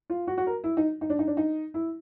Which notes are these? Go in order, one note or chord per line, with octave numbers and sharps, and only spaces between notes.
F4
F#4
F#4
A#4
E4
D#4
D#4
D4
D#4
D4
D#4
E4